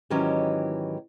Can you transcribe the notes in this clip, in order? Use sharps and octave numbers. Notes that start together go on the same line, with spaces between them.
G#2 D#3 E3 F#3 C#4 G4